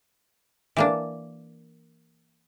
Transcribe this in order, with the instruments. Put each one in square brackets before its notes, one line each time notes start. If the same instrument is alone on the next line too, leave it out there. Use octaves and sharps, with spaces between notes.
[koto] E3 A#3 D4